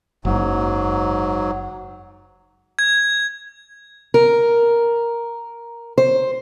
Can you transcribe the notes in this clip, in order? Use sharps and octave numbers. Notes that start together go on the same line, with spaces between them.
F#1 G#2 F#3
G#6
A#4
C5